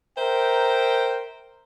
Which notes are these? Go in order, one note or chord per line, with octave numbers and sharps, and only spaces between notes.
A#4 C5 E5 G5